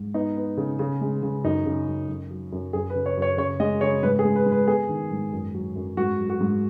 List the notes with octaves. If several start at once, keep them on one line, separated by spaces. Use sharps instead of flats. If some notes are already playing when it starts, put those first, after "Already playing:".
Already playing: G#2
B3 D#4
B3
C#3
C#3
G#3
C#3
F#2 D#4
C#3
F#2
F#2
F#3
F#2
F#2 G#4
B4
C#3
C#5
F#2
C#5
C#3 C#5
G#3 D#5
C#3 C#5
G#2 B4
G#4
G#3
B4
G#2
B4
B3 G#4
D#3
G#2
F#2
F#3
F#2
G#2 F#4
F#3
F#4
G#2